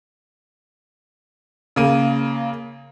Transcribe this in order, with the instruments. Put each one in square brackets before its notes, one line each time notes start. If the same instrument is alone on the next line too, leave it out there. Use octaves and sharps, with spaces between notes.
[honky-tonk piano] C#3 A#3 D#7